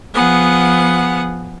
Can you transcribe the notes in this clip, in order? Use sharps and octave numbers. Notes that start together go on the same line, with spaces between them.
F3 B3 G#4 F#5